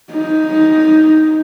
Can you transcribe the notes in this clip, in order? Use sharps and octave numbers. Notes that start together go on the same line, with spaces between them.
D#4